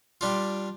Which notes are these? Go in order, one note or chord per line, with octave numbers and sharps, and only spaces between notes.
G3 D4 F4